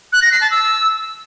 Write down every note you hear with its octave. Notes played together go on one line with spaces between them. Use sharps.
F#6
A#6
C7
A5
E6